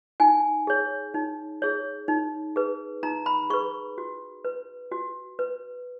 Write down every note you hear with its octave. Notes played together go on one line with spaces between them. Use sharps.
D#4 G#5
G#4 C#5
D#4
G#4 C#5
D#4
G#4 B4
D#4 A#5
B5
G#4 B4 C#6
F#4
B4
F#4
B4